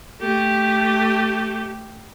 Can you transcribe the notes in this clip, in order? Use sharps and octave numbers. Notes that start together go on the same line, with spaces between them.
A3 G4